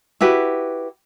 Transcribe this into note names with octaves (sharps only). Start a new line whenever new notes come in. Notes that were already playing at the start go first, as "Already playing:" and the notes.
E4 F#4 G4 B4